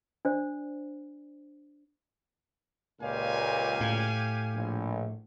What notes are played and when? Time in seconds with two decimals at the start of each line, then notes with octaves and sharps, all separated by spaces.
0.25 D4 C5 D5
3.02 C#2 A#2 G4 F5 G#5
3.81 A2
4.55 A#1